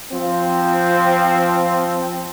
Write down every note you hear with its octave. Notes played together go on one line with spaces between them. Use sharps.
F3 C4